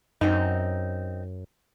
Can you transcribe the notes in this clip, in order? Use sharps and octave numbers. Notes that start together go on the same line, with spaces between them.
F#2 C4 D#4